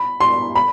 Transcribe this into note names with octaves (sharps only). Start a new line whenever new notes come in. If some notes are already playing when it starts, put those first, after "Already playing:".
Already playing: B5
C6
B5